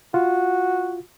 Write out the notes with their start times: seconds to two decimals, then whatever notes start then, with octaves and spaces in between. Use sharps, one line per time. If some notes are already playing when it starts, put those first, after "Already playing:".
0.14 F4 F#4